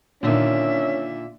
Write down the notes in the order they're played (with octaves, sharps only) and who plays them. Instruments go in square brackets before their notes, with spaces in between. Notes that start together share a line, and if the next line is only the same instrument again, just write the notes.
[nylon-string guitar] A#2 [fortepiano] D3 D#3 [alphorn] C#4 [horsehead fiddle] D4 E5